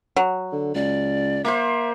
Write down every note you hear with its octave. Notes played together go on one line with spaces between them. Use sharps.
F#3
D3
C#2 D5
A#3 C5 E5